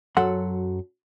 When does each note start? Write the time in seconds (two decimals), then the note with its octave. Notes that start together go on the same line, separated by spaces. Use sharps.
0.17 F#2 F#3 A4 F#5 C6